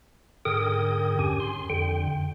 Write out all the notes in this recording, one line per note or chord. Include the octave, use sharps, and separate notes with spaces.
G#2 D3 G#4 A#4 G5 D#6
E2 G2 C#4 G4 G#5
C6
F2 D3 G5